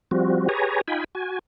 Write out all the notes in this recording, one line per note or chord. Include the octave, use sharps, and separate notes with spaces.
F3 G3 C4 F#4
G4 G#4 B4 C#5 G#5 A#5
D#4 F4 G5 G#5 B5
F#4 G#5